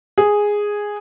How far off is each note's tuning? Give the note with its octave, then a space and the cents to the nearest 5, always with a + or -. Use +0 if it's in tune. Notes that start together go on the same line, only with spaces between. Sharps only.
G#4 -5